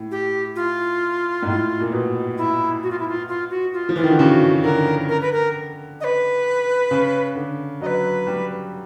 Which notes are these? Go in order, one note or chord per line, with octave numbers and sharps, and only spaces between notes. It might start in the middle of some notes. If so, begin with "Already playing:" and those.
Already playing: A2
G4
F4
G#2
A2
A#2
B2
E4
F#4
F4
E4
F4
F4
F#4
F4
F3
E3 F4
D#3
D3
C#3 F#4 G4
D3 A#4
A#4
B4
A#4
D#5
B4
C#3
D3
F#3 D#5
B4
G3